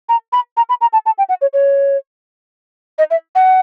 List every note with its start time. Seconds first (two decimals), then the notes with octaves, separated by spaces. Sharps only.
0.09 A#5
0.33 B5
0.57 A#5
0.69 B5
0.81 A#5
0.93 A5
1.06 A5
1.18 G5
1.29 F#5
1.42 C#5
1.53 C#5
2.98 D#5
3.11 E5
3.35 F#5